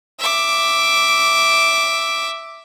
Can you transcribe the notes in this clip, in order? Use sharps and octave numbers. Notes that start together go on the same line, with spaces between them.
E5 D6